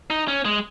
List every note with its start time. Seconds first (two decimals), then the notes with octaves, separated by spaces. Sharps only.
0.10 D#4
0.28 C#4
0.45 G#3